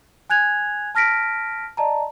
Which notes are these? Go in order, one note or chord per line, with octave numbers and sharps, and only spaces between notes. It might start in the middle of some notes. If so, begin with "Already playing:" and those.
G#5 F#6 G#6 F7
A5 F6 A#6 B6 D7
D5 D#5 A5 A#5